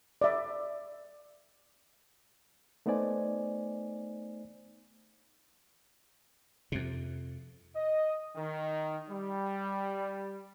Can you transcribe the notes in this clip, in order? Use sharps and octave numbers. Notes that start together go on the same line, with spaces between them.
D5 E5
A3 B3 D#4 C5 D5 G#5
F2 C3
D#5
D#3
G3